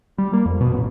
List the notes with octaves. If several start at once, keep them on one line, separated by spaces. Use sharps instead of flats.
G3
A#3
F2
B2
A1